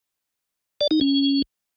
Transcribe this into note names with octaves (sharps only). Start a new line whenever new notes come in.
D5
D#4
C#4